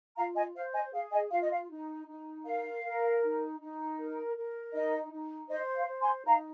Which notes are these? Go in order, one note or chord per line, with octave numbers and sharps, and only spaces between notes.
F4 F5 A#5
D#5 G#5
C5 F5
D#5 G#5
G#4 F5
D#5 G#5
F4 F5
D#5
F5
D#4
D#4
A#4 F5
A#4
D#4
D#4
A#4
A#4
D#4 D#5
D#4
C5 D#5
F5
C5
G#5 C6
D#4 F5 A#5